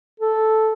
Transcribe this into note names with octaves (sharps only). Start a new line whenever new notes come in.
A4